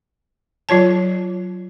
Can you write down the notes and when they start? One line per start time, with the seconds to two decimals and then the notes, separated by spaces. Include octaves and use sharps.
0.69 F#3 F4 C#5 A5